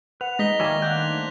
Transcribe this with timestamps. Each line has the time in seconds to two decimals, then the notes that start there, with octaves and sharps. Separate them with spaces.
0.21 B4 F#5 F7
0.39 G#3 D#4 A#6 B6 G7
0.60 D#3 G3 A#3 C#5 E5 G#5
0.82 F#5 G5 F#6 G#6 F7
0.95 A3 D4 C5